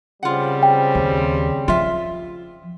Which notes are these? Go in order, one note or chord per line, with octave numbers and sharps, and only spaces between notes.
C#3 G3 C4 F4 F#5
G5
D#2
F3 F4 E5